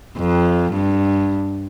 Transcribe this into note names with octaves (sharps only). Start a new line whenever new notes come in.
F2
G2